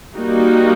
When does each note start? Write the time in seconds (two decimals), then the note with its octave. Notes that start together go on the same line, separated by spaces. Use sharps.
0.16 G3 A#3 D#4 F#4